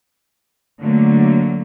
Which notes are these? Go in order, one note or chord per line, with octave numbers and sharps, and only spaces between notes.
D3 F#3 A3 A#3